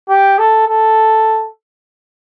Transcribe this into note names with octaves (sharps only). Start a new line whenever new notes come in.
G4
A4
A4